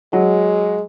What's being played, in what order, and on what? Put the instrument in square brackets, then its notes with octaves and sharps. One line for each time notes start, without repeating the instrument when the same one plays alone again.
[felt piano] F#3 [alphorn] G#3